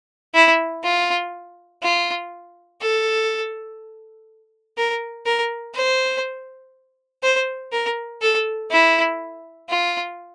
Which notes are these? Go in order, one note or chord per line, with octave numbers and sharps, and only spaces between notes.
E4
F4
F4
A4
A#4
A#4
C5
C5
A#4
A4
E4
F4